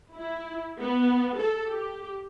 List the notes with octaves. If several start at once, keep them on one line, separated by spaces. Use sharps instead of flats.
E4
B3
A4
G4